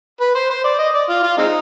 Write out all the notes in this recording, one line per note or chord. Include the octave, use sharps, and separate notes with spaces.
B4
C5
C5
D5
D#5
D5
F4
F4
G#3 C4 D#4